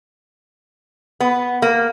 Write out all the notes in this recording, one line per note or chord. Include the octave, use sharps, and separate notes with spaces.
B3
A#3